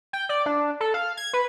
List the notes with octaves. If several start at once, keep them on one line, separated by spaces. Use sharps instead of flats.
G5
D5
D4
A4
F5
G#6
B4